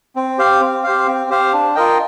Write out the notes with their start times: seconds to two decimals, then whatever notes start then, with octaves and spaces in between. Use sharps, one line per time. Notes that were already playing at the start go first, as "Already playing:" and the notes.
0.16 C4
0.38 G4 C5 F5
0.61 C4
0.84 G4 C5 F5
1.06 C4
1.30 G4 C5 F5
1.53 D4
1.75 F4 A#4 D#5 G5